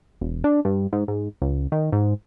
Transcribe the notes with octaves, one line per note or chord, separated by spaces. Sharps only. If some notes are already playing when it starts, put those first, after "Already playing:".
E1
D4
G2
G#2
G#2
C#2
D#3
G#2